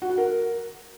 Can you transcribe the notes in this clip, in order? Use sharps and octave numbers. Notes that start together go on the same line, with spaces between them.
F#4
F#5
A#4